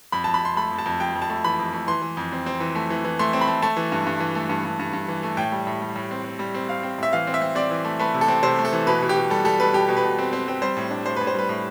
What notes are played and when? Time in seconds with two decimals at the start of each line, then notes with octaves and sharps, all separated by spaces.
0.12 F2 B5
0.24 F2 A5
0.34 B5
0.42 F2 C6
0.56 A3 B5
0.72 F2
0.78 A5
0.86 F2
1.00 F2 G5
1.15 F2
1.22 A5
1.29 A3
1.44 E3 B5
1.59 F2
1.73 A3
1.87 E3 C6
2.02 E3
2.17 F2
2.32 C4
2.46 C4
2.60 E3
2.75 A3
2.90 E3
3.04 E3
3.19 A3 C6
3.33 C4
3.41 B5
3.48 A3
3.62 A3 A5
3.77 E3
3.92 G2
4.07 G2
4.20 E3
4.35 A3
4.49 G2
4.65 G2
4.79 G2
4.93 G2
5.08 E3
5.23 A3
5.37 A2 G5
5.52 G3
5.67 A2
5.82 G3
5.96 A2
6.11 C4
6.24 C4
6.39 G3
6.55 C4
6.68 C4 F5
6.83 C4
6.98 A2 E5
7.13 E3 F5
7.27 C4
7.34 E5
7.42 C4
7.55 C4 D5
7.71 E3
7.85 A3
7.99 A3 B4
8.14 C3
8.21 A4
8.28 C4
8.43 C3 C5
8.59 A3
8.65 A4
8.73 E3
8.87 B2 B4
9.02 B2
9.09 G4
9.16 B2
9.30 G3 A4
9.45 G3 A4
9.60 B2 B4
9.74 B2 G4
9.89 B2
9.97 B4
10.03 B2
10.19 C4
10.33 C4
10.48 C4
10.62 G3 C5
10.77 A2
10.91 D4
11.06 A2 C5
11.16 A2 B4
11.27 C5
11.35 G3 B4
11.49 A2